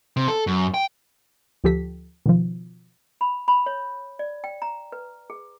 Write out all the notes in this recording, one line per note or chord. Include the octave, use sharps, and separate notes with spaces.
C3
A4
F#2
G5
D2 F3 G4 A4 B6
B2 D#3 F3
B5
B5
C#5
D5
G5
A#5
B4
G#4